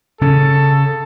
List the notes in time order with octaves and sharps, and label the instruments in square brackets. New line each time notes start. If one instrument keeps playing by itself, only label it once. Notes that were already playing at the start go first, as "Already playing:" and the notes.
[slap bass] C#3 C#4 [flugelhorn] A4